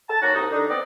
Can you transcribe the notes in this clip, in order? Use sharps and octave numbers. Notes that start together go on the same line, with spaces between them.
A5
F#3 A#3 D#4 F#4
C2 D#4
D3 D4 D#4
B3 C4 B4 D5 D#5